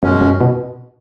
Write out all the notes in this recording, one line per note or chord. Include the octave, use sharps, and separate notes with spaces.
F#2 B2 G#3 C#4
F#2
B2